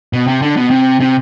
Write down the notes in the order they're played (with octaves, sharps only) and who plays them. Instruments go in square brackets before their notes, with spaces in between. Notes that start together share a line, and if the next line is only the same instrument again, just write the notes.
[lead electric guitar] B2
C3
D3
B2
C3
C3